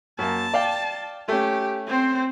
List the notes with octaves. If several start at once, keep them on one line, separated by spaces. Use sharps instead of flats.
F#2 A#3 A5
D5 F5 G5
A3 C#4 G4
C4 C5